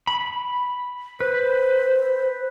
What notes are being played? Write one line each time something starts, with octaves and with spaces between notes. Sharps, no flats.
B5
B4 C5